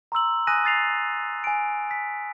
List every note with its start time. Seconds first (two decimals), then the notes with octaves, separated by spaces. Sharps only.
0.12 A#5 C6 E6 F#7
0.47 G#5 D#6 F#6 A#6 D#7
0.64 D#6 A6 C7 F7
1.44 G#5 D7
1.91 B6